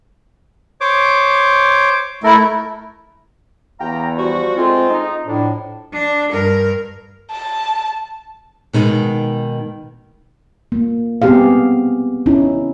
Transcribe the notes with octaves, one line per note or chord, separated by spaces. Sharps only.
C5 C#5 D6
A3 E4 A4 A#4
E2 F5 G5 A#5
F3 G3 F#4
G#3 A3 C4 F4
D#4
F2 A2 D4
D4
G2 A#4
A5
B2 D#3 G#3 D#4
A#3
B3 C4 G4 G#4 F5
C#4 D#4 E4